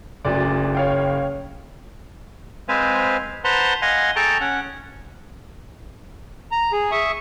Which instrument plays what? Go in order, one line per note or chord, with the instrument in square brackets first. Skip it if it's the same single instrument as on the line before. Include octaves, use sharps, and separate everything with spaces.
[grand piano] F#1 [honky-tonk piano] D2 D5
[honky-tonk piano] C#5 F5 G5
[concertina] G#3 C4 B4 C5 F5 G#5
B4 C5 F#5 A5 A#5 C6
D#5 F5 F#5 G#5 C6
G#4 A4 G5 A5 A#5 C#6
C#4 F#5
[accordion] A#5
G#4
E5 C#6 D#6